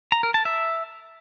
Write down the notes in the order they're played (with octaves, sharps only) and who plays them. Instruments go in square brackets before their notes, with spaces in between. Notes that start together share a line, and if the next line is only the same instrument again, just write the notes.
[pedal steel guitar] A#5
A#4
A5
E5